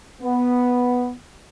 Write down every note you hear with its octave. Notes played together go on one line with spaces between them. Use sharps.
B3